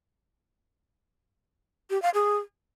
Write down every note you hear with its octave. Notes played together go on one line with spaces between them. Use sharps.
G4
F5
G#4